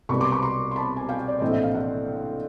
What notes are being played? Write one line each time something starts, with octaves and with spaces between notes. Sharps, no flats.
C2 B2 G3 B3 B5 C#6
C6 D6
B5 C#6
A#5 C6
C6
A5 B5
G#5
F5 G5
D5
A#1 A2 E3 A3 C4 D#5
E5
F5
E5 F#5